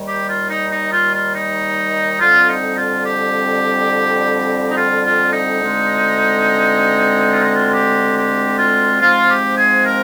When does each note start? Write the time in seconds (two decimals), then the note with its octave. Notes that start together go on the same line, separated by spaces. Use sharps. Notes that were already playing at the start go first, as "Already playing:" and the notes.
Already playing: D#2 D#3 G3
0.08 G4
0.29 F4
0.50 D#4
0.72 D#4
0.93 F4
1.14 F4
1.35 D#4
2.21 F2 D3 G3 C4 F4
2.49 D#4
2.77 F4
3.05 G4
4.71 D#4
4.76 F4
5.04 F4
5.33 D#4
5.62 D2 D3 G#3 C4
7.32 F4
7.43 D#4
7.55 F4
7.74 G4
8.17 G4
8.59 F4
9.01 G#2 F3 G#3 C4 F4
9.30 G4
9.58 G#4
9.86 A#4